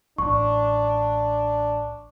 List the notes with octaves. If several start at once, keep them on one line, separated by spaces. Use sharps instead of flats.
A1 D4 C#6